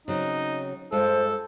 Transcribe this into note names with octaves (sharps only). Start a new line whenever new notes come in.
C#3 F#3 C4 D#4
G2 G#3 F4 A4 C5